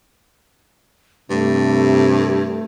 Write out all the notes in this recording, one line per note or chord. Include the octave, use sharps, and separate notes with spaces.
G2 C3 A3